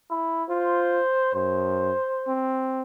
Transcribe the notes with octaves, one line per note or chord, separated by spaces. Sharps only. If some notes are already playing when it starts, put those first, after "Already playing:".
E4
F4 C5
F#2 C5
C4